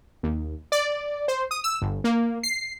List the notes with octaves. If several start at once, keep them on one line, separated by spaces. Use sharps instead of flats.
D#2
D5
C5
D#6
E6
G1
A#3
C7